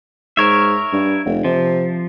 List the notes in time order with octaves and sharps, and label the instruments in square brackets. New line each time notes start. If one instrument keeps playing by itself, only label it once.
[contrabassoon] G#2 [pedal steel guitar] A#4 C#5 E5
[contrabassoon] G2
F1
[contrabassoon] C3 [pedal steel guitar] F3